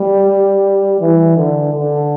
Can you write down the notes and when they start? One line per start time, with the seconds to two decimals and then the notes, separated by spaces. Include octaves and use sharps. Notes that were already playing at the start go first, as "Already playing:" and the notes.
Already playing: G3
1.00 E3
1.37 D3
1.74 D3